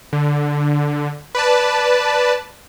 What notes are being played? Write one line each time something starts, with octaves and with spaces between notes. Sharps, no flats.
D3
B4 D5 A5